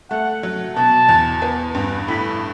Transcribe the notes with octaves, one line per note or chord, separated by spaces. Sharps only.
A3 F#5
F#3
B2 A5
E2
B3
G2
A2 B5